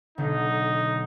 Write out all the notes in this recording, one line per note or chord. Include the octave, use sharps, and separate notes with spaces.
B1 D3 D#4